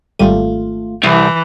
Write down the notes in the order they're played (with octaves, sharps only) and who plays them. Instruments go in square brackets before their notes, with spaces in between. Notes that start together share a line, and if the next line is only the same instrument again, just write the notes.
[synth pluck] G#1 G3 D#7 [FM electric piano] A3 F4
[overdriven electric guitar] C2 [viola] E3